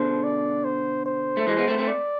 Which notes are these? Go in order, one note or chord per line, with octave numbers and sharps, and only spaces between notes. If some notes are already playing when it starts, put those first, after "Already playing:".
Already playing: B2 D3 C5
D5
C5
C5
A3
E3 G#3
G#3 B3
A3 C4
A3 C4
D5